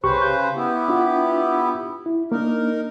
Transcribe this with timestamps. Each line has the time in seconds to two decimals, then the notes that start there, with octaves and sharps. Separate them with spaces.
0.04 C2 C#3 G4 B4 C5 C#6
0.22 G6
0.56 B3 E4 G4
0.88 D4 F4 F#5
2.06 E4
2.32 A#3 D4 D#4 A#4